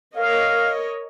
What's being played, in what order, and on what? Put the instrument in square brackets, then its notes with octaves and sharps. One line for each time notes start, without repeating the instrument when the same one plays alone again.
[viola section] A#4 C#5 D#5 [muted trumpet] F5